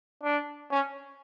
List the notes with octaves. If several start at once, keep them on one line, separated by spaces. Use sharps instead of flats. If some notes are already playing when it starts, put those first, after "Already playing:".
D4
C#4